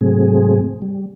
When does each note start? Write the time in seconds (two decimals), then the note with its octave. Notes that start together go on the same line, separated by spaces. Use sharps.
0.01 G#2 C3 F#3 A3 C4 G#4
0.82 G3